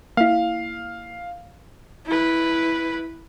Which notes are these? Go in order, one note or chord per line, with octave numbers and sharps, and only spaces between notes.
A#3 E4 F5
E4 B4